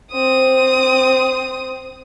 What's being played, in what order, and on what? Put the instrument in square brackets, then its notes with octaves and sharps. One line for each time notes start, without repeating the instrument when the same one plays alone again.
[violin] C4 D#6